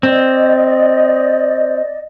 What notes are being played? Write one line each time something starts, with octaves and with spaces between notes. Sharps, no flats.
C4 D5 D#5